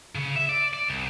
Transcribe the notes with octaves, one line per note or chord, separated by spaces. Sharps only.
C#3
E5
D5
D5
C2